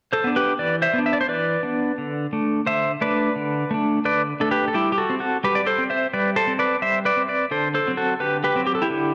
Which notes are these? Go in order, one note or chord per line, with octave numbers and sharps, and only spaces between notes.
A4 C5
B3 D4
G4 B4
E3 B4 D5
C5 E5
B3 D4
E5
D5
C5
E3 B4 D5
B3 D4
D3
A3 D4
D3 C5 E5
A3 D4 B4 D5
D3
A3 D4
D3 B4 D5
A3 D4 A4
G4 B4
A4
G3 E4 G4
G4
F#4 A4
C4
F#4 A4
G3 G4 B4
D5
A4 C5
C4
C5 E5
G3 B4 D5
A4 C5
C4
B4 D5
G3 C5 E5
B4 D5
C4
B4 D5
D3 A4 C5
A4 C5
F#3 C4
F#4 A4
D3 G4 B4
G4 B4
F#3 C4
G4
A4
E4 G4
D3